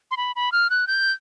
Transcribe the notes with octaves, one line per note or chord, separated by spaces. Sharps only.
C6
B5
B5
F6
F#6
G6